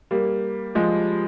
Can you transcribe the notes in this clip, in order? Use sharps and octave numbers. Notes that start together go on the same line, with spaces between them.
G3 A#3
F3 G#3